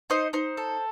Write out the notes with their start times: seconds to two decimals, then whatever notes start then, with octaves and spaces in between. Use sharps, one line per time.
0.10 D#4 C5 D#5
0.33 D#4 C5
0.57 A4